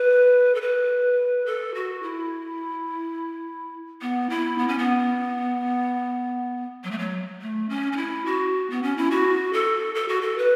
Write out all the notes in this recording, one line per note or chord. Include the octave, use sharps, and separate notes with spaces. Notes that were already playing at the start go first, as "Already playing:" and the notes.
Already playing: B4
A4
B4
A4
F#4
E4
B3
E4
B3
C#4
B3
F#3
A3
F#3
A3
C#4
C#4
E4
F#4
B3
C#4
E4
F#4
A4
A4
F#4
A4
B4